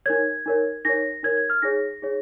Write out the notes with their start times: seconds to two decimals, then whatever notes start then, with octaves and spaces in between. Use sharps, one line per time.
0.06 D#4 A#4 C#5 G#6
0.46 D#4 A#4 C#5
0.85 D#4 A#4 C#5 A#6
1.23 D#4 A#4 C#5 G#6
1.37 G#6
1.50 F6
1.62 D#4 G#4 C#5 A#6
2.02 D#4 G#4 C#5